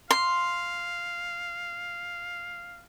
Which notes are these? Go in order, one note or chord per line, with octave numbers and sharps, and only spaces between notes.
F5 C6